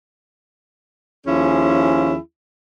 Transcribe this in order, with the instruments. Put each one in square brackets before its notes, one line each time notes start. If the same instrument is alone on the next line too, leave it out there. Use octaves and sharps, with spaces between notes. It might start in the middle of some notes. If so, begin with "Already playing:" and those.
[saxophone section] D#2 F3 C#4 E4 G#4